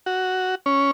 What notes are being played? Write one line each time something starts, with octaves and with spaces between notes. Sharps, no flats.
F#4
C#4